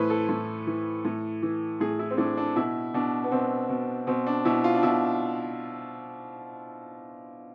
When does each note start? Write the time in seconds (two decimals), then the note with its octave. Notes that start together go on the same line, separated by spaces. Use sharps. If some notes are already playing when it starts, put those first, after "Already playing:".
Already playing: A2 E3 B4 C5
0.10 A4
0.29 A2
0.67 E3
1.05 A2
1.42 E3
1.80 A2 G#4
1.99 E4
2.11 C4
2.18 A2 D4
2.37 D4
2.55 B2 E4
2.94 B2 D4
3.24 B3
3.32 B2 C4
3.69 B2
4.07 B2 C4
4.27 D4
4.45 B2 E4
4.64 F4
4.75 D4
4.83 B2 E4